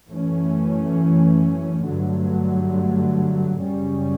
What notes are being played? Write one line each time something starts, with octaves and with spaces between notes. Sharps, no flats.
F#2 E3 A3 C#4
G2 D3 F#3 A3
F#2 C#3 G3 C#4